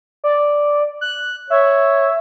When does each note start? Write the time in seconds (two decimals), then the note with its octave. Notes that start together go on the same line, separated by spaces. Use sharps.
0.24 D5
1.01 F#6
1.50 C#5 E5